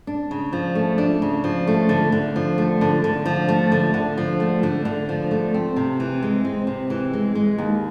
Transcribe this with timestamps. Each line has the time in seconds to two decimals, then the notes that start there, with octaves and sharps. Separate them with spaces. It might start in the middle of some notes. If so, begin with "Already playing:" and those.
0.07 D4
0.31 C#3
0.53 F3
0.75 A3
0.98 D4
1.22 C#3
1.44 F3
1.67 A3
1.89 D3
2.12 D3
2.36 F3
2.58 A3
2.81 D3
3.04 D3
3.26 F3
3.49 A3
3.72 D3
3.94 D3
4.17 F3
4.40 A3
4.63 D3
4.85 D3
5.09 F3
5.31 A3
5.54 C4
5.76 C3
6.00 E3
6.23 G#3
6.45 C4
6.67 C3
6.90 E3
7.13 G#3
7.35 G#3
7.58 D#2